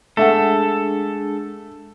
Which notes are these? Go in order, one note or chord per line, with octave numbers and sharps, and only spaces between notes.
G#3 A3 D4 G#4 A4 E5 F#5